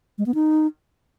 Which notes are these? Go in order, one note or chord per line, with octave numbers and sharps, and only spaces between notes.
G#3
B3
D#4